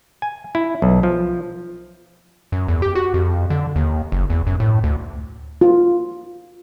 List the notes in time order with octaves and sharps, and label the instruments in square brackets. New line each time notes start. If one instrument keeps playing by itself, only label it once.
[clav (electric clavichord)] G#5
E4
B1
F3
[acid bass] F#2
E2
G4
F#4
F2
D3
D#2
F#1
E2
F#2
A2
D2
[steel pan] F4